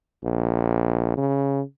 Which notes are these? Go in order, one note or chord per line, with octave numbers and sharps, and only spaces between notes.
A#1
C#3